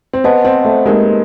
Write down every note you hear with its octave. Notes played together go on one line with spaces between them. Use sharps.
C4
B3 G#4 C5 D#5 F#5 A5
C4
A3
G#3 A#3 D#4 G4 A#4 D#5